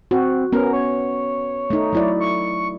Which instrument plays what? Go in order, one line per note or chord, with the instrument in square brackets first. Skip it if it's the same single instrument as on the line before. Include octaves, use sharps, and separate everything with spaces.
[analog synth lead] C4 [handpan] F#4
[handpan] B3 C#4 [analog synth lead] A#4
[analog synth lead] C#5
[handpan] A3 D#4
F#3 E4 D5
[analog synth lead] C#6